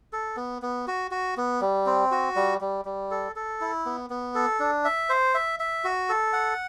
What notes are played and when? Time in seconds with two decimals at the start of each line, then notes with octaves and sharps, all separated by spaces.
0.13 A4
0.37 B3
0.62 B3
0.87 F#4
1.11 F#4
1.37 B3
1.61 G3
1.86 C4
2.11 F#4
2.36 G3
2.61 G3
2.85 G3
3.11 A4
3.36 A4
3.61 E4
3.86 B3
4.10 B3
4.35 A4
4.60 D4
4.85 E5
5.09 C5
5.34 E5
5.60 E5
5.84 F#4
6.09 A4
6.33 F#5